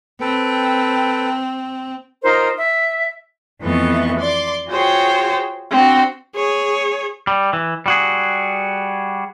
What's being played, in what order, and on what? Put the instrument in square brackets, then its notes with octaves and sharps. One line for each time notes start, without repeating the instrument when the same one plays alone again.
[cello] C4 [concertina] A4 B4 G5
[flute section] D#4 F4 A#4 C5
E5
[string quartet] F2 E3 A3 B3 D#5 C#6
D5 C6 D6
F4 F#4 G#4 C5 C#5 G5
C4 D4 F#4
[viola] G#4 C#5
[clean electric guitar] G3
E3
G3 F#4 G#4